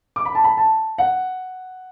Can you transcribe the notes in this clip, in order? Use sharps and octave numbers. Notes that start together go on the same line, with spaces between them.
D6
B5
A5
B5
A5
F#5